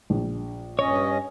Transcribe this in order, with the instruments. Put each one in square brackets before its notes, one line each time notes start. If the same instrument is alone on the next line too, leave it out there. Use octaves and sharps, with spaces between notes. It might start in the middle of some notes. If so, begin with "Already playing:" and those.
[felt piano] A#1
[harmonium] G2 C#4 D#5 [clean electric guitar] C#5